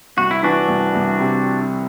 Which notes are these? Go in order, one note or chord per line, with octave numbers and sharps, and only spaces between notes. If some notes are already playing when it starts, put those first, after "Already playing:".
C2 F#4
E4
E3 D4 F#4
C2
C2
C3